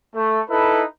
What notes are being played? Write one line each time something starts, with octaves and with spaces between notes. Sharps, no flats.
A3
D#4 E4 A4 B4